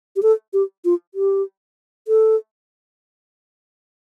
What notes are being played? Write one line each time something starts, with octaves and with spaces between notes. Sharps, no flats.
G4
A4
G4
F4
G4
A4